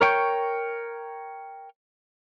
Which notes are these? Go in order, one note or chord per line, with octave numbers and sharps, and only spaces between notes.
A#4 C#5 G5 C#6 G6